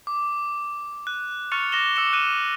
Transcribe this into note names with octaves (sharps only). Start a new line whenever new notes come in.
D6
F#6
C#6 F6 F#6 A6 C#7 F7
D6 A#6 E7 G7
D6 E6 C#7 E7
F#6 D#7 E7